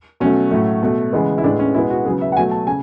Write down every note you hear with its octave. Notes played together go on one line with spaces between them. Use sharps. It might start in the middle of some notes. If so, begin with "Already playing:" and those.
B2 F#3 A3 C#4
A2 F#3 A3
B2 A3
C#3 E3 G#3 B3
E4
A2 G#3 B3 D4
C#4
B2 G#3 B3 E4
F#4
C#3 F#3 B3 G#4
E5
F#5
B2 F#3 A3 G#5
A5
C#3 G#5